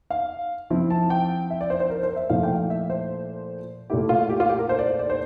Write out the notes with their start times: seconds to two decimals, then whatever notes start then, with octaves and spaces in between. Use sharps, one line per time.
0.10 F5
0.70 F3 C4 E4
0.90 A5
1.10 G5
1.50 E5
1.61 D5
1.70 C5
1.80 C5
1.90 A#4
2.03 C5
2.16 E5
2.30 A#2 F3 A3 E4 F5
2.43 G5
2.56 F5
2.70 E5
2.90 C5
3.90 A#2 A3 E4 G4
4.09 F4
4.29 G4
4.40 F4
4.49 G4
4.59 A#4
4.69 C5
4.79 D5
4.99 D5
5.10 C5